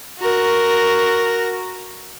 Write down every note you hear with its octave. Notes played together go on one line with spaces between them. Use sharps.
F#4 A#4